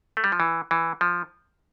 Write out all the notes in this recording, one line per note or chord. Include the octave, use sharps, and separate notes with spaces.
A3
G3
F3
E3
E3
F3